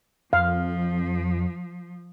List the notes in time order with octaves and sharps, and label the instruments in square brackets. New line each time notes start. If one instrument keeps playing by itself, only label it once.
[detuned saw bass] F2 [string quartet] F3 [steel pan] F5